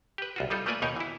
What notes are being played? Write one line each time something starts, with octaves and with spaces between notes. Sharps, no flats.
G4 B4
C2 F4 F#4
G3 D#4 F4 A4
A3 A#3 F4 B4 D5 G#5
D#2 B2 D#4 G4 A#4 C#5
E3 E4